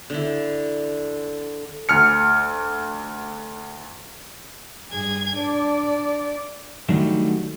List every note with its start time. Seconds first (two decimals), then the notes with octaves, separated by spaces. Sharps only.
0.10 D3 E4
1.89 D2 F6 C#7
4.91 G2 G#4 G#6
5.36 D4 D5
6.89 D3 D#3 F#3 G3 A3